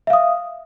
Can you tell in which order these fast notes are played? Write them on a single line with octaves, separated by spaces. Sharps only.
E5 F5 D#6